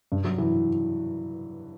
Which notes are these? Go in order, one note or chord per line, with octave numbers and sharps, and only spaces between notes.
G2
F#3
E3